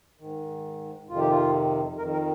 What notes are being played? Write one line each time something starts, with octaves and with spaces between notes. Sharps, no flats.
G#2 D#3
F2 C3 D#3 F4
G4
F4
F2 D#3 A#4
A#4